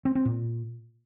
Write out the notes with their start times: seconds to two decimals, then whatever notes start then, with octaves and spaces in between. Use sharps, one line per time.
0.05 C4
0.15 C4
0.25 A#2